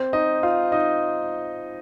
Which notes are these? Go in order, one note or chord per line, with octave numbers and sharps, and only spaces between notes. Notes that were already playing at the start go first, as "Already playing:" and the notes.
Already playing: C4 C5
D#4 D#5
F4 F5
D#4 D#5